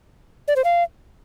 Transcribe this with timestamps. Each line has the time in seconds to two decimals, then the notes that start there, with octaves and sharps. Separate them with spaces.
0.48 D5
0.56 C5
0.64 F5